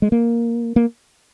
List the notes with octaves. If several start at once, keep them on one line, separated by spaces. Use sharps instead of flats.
G#3
A#3
A#3